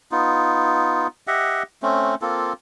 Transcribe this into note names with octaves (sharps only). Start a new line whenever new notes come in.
B3 D#4 F4
G4 D#5 E5 F#5
A3 C4 C#4
A#3 C4 F4 A4